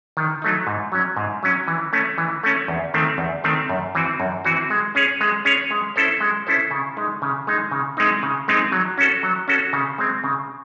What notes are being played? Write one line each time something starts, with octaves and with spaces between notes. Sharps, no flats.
D#3
F#3 A3 D#4
G#2
F#3 C#4
G#2
F#3 C#4
E3
A3 C#4
E3
A3 C#4
E2
D#3 A3 C4
E2
D#3 A3 C4
F#2
E3 C4 F#4
F#2
E3 C4 F#4
G#3
C#4 G#4 C#5
G#3
C#4 G#4 C#5
G#3
C#4 E4 A4 C5
G#3
C#4 E4 A4 C5
C#3
G#3 D#4
C#3
G#3 D#4
C#3
G#3 C4 D#4
C#3
G#3 C4 D#4
F#3
C#4 F#4 A4
F#3
C#4 F#4 A4
C#3
G#3 C4
C#3